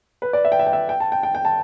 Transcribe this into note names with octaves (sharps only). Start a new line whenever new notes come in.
B4
D5
E5
G5
E5
G5
E5
G5
A5
G5
G5
G5
A5